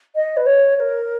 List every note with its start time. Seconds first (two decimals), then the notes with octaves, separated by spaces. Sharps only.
0.15 D#5
0.36 B4
0.45 C#5
0.75 C#5
0.79 A#4